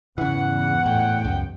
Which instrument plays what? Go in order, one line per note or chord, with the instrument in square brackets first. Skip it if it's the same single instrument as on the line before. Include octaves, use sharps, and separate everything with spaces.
[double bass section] E2 G#2 [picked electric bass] C#3 E3 [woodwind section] F#5
[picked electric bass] A2 [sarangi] G5
[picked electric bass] C#2 F#2